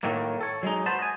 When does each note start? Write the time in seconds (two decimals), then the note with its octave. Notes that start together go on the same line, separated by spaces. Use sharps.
0.03 A2 D#3 F#3 A#3
0.41 A4 C#5
0.63 F#3 G#3 D4 D#4
0.86 F#4 B4 C5 A5
0.99 D#5 G#5